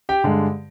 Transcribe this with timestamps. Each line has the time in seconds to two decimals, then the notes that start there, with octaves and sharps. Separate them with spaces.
0.09 G4 G5
0.24 G2 D3 G#3